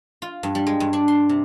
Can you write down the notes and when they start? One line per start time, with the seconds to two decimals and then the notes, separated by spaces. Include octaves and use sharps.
0.22 F4
0.43 G2
0.55 G3
0.67 G#3
0.80 G2
0.93 D4
1.08 C6
1.29 C3